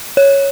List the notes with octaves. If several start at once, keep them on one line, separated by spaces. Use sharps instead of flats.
C#5